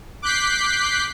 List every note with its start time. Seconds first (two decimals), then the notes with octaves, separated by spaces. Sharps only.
0.22 D6 F#6 G6 B6 C7